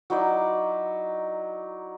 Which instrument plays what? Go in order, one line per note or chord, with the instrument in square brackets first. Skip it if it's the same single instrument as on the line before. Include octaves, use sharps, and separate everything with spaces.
[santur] F#3 D#4 E4 D5